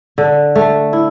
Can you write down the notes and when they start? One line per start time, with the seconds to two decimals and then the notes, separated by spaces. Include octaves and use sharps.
0.18 D3
0.55 A3
0.93 E4